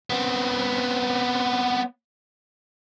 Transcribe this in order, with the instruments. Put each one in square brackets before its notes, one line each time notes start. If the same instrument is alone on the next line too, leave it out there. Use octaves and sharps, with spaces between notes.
[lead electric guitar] B3 C4